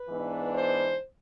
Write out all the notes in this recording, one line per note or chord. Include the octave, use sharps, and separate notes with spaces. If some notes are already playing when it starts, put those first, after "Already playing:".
Already playing: B4
G#2 E3 B3 D4
C5